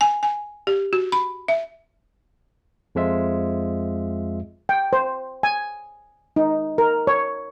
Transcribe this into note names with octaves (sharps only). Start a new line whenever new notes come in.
G#5
G#5
G4
F#4
B5
E5
F2 F3 G#3 F4 E5
G5
C5
G#5
D#4
A#4
C#5